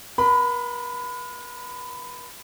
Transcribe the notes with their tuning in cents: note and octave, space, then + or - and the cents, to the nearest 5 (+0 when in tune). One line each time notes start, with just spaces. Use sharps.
A#4 +45 B5 +20